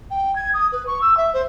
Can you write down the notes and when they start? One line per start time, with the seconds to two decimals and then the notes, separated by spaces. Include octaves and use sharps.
0.11 G5
0.36 G#6
0.54 D#6
0.72 B4
0.87 C#6
1.01 E6
1.17 E5
1.33 C5